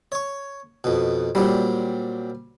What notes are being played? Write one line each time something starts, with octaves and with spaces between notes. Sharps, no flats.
C#5 C#6
F2 B2
A#2 F#3 G3 C4